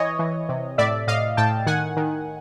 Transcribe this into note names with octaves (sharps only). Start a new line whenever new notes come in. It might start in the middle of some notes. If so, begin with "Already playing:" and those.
Already playing: E3 C#5 D#5
E3
C3
A2 D5 E5
A2 D#5 F5
A2 G5 A5
D#3 F#5 G#5
D#3